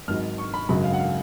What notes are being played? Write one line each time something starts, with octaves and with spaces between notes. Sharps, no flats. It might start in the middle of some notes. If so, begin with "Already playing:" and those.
G#1 G#2 F#3 F6
C#6
B5
G#1 F#2 C#3 F#3 B5
F5
F#5
F5